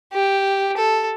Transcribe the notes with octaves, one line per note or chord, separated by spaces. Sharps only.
G4
A4